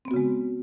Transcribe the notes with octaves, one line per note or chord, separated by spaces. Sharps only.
C#3 G#3 B3 C4 F#4